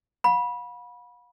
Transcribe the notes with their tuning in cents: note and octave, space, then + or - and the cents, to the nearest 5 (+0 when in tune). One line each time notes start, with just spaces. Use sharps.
F5 +45 B5 -20